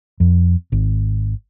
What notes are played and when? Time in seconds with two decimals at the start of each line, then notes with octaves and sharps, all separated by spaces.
0.20 F2
0.72 G#1